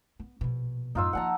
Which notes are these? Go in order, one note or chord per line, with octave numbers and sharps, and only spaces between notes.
B3
A#1 B2
F#2 A2 D#4 F4 E6
F3 A#3 F#5 A5 A#5